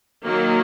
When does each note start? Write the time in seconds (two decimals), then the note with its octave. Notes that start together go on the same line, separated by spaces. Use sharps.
0.23 D#3 F#3 A#3